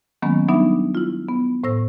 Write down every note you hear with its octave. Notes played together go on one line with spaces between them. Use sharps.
D#3 F#3 G#3 A#3 B3 C#4
F#3 G3 B3 D4 D#4 E5
E4 F4
B3
A2 C5 E6 A#6